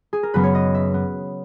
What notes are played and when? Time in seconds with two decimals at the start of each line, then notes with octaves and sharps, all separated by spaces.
0.13 G#4
0.23 A#4
0.34 F#2 C#3 F#3 B3 B4
0.44 C#5
0.55 D#5
0.75 E5
0.94 B3